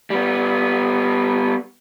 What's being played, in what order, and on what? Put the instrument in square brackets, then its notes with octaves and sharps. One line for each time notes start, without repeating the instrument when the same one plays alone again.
[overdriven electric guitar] G3 B3